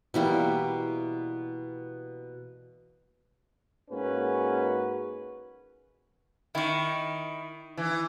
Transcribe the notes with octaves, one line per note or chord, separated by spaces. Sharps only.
B2 E3 G3 A#3
G#2 A#3 C#4 F#4 B4
D#3 E4 C#6
E3